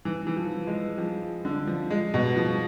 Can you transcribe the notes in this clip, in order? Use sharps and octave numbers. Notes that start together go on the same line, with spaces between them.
E3
E3
F3
G#3
F3
D3
F3
G#3
B2
F3